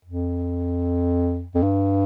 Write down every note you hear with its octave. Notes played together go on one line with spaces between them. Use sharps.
F2
F2
G2